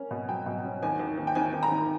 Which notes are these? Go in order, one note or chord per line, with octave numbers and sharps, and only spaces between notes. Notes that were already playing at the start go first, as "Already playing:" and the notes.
Already playing: A#3 C#4
B2
F#3 G5
B2
C#4
D#2 G#5
D#2
D#2
G5
D#2 G#5
D#2
A#5
D#3